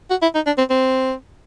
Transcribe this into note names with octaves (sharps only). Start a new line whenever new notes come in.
F#4
E4
D#4
D4
C4
C4